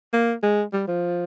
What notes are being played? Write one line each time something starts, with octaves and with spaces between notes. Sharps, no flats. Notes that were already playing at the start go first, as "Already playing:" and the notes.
A#3
G#3
G3
F3